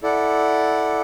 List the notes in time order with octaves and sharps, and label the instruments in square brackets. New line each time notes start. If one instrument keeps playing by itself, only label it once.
[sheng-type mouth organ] E4 A4 D5 F#5